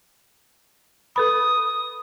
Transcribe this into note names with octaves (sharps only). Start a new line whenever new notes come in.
A4 B4 B5 D#6